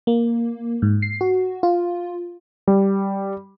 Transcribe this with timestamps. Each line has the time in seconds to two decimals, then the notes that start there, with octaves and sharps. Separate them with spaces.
0.07 A#3
0.82 G#2
1.02 C7
1.21 F#4
1.63 F4
2.67 G3